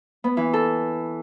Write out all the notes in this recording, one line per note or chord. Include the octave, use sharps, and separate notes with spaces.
B3
E3
A4